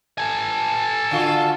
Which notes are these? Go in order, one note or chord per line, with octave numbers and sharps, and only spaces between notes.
A4 G#5
D3 F4 F#4